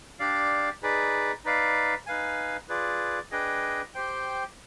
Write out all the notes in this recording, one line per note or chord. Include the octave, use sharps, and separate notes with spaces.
D4 G4 D5 F5
D#4 G#4 B4 D5
D#4 B4 D5 F5
D#4 B4 F5 G#5
F4 G#4 B4 D5
D4 G#4 B4 D#5 G5
G4 C5 G5